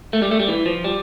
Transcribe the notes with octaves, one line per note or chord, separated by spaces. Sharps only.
A3
G3
A3
G3
E3
F3
G3